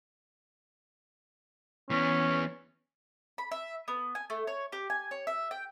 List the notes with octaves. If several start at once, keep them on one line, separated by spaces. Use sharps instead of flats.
E3 B3 C#4
B5
E5
B3
G#5
A3
C#5
G4
G#5
C#5
E5
G5